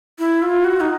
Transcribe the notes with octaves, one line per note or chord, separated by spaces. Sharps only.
E4
F4
F#4
D#4